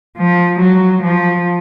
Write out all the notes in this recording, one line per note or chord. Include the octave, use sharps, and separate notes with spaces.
F3
F#3
F3